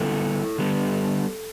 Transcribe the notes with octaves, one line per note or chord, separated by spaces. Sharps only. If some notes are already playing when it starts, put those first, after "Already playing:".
Already playing: D3 G3 B3 E4 A4
D3 G3 B3